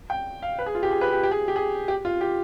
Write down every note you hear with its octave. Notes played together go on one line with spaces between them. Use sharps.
G5
F5
B4
G#4
F4
G4
G#4
B4
G4
G4
G#4
G4
G#4
G4
F4
G4